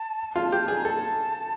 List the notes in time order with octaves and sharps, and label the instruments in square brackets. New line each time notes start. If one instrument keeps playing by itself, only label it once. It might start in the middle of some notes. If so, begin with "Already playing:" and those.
Already playing: [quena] A5
[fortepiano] F4
G4
G#4
[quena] A#5
[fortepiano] A4 [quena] A5